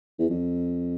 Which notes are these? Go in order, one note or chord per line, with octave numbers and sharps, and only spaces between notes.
E2
F2